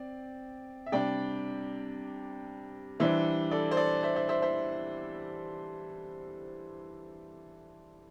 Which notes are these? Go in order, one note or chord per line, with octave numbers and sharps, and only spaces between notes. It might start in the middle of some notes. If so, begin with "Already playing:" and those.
Already playing: C4 D5
E5
C3 G3 D4 D5 G5
E3 G3 D4 C5 E5
A4 D5
C5
A4 D5
C5 E5
C5 E5
C5 E5
C5 E5